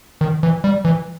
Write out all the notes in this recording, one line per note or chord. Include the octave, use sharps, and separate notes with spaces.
D#3
E3
G3
E3